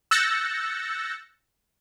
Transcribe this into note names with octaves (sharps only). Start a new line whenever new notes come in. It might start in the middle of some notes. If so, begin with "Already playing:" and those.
E6 F#6 G6 A6 A#6 C#7